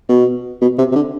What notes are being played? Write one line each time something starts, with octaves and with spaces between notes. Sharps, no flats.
B2
B2
C3
C3
D3